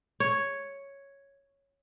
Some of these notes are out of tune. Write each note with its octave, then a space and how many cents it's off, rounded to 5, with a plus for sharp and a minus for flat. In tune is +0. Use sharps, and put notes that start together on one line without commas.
C#5 +0